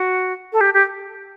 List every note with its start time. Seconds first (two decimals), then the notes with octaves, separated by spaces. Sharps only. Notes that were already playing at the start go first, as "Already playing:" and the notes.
Already playing: F#4
0.53 A4
0.61 G4
0.74 G4